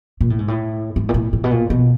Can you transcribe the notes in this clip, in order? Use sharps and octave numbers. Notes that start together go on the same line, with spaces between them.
A#2
A2
G#2
A2
G#2
A#2
A2
A2
B2
A#2
B2